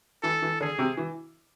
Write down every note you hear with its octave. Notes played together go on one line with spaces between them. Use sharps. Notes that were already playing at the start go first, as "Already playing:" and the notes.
E3 A4
E3
D3 G#4
C3
E3